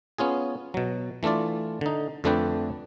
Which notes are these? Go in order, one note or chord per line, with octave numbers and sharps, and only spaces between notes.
B3 C#4 F4 G#4
B2 F#3
E3 A3 D4 F4 D5
D3 D#4
F2 D3 A3 D4 B4 G5